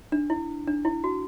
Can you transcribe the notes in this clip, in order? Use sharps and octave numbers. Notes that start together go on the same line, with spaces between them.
D4
E4
D4
E4
F#4